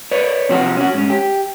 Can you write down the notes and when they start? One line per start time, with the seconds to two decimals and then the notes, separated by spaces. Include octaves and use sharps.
0.11 B4 C#5 D5
0.49 C3 F3 F#4
0.77 C#4 F#4
0.94 G#2 C#4
1.10 G4